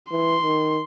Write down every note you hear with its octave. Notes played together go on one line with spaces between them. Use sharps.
E3 C6
D#3